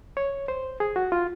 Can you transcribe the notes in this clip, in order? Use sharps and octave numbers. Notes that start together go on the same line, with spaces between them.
C#5
C5
G#4
F#4
F4